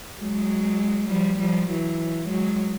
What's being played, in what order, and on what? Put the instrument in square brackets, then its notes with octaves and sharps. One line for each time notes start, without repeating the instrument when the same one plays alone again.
[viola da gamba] F#3 G#3
F3 G3
F3 G3
E3 F#3
F#3 G#3